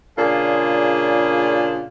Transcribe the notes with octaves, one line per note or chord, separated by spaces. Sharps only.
A#2 C#3 D4 F4 G#4